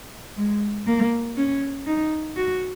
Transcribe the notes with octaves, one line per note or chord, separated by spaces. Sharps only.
G#3
A#3
C#4
D#4
F#4